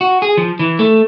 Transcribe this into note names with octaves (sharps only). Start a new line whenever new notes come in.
F#4
G#4
F3
E3
A3